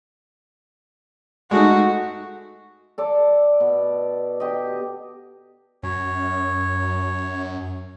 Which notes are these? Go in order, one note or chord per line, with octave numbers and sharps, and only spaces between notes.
G#3 A3 D#4 F#4
A4 D5
B2
G4 D#5
F#2 C#5